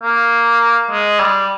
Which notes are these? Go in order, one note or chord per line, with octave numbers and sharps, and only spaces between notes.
A#3
G#3
G3